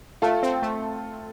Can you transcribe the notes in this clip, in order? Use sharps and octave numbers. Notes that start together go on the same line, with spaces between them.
A3 F4 A4
C4
A3